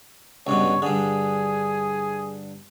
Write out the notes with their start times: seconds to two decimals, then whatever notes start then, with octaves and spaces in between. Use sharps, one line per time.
0.47 C#2 G2 B2 C#5
0.82 G2 D3 G#4